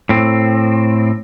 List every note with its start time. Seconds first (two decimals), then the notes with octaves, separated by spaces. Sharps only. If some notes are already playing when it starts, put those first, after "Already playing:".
0.09 A2 C4